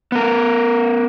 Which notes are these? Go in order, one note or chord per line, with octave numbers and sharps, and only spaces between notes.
B3 A#4